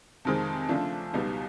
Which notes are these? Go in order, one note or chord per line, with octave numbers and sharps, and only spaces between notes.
F2 C3 D#3 G#3 C4
C#3 F3 A3 D4
C#2 B2 G3 B3 D#4